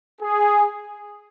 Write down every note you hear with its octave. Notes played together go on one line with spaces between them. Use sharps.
G#4